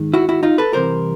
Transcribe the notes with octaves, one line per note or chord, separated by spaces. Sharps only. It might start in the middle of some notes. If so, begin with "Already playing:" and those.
Already playing: G#2 D#3 G#3
E4 F#4
E4 F#4
D#4 F4
A4 B4
C2 C3 E3 A#4 C5